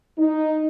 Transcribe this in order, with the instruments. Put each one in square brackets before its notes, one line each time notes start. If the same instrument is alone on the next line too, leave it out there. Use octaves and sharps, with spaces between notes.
[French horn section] D#4